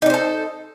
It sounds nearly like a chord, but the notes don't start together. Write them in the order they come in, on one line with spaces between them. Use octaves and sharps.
D#4 D5 C5 A4